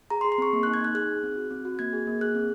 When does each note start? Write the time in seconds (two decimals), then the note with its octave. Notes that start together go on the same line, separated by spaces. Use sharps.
0.10 G#4 A#5
0.21 C6
0.24 G#4
0.32 C6
0.38 C4 C#6
0.53 A#3
0.63 D#4 F#6
0.74 G#6
0.81 D#4 F#6
0.95 G#4 F#6
1.09 G#4
1.23 C4
1.36 F#4
1.51 C4
1.65 F#4
1.79 A#3 G#6
1.93 G#4
2.07 A#3
2.21 G#4 F#6
2.35 C4